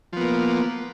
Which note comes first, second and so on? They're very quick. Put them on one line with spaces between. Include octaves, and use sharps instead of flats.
F3 B3 A#3